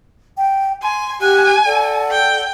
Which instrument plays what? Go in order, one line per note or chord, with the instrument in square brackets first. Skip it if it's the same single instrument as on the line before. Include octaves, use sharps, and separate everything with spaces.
[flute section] G5
[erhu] G#5 [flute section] C6
[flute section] G4 F#5 F#6 [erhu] G#5
[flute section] A4 D5 F#5
[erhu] G5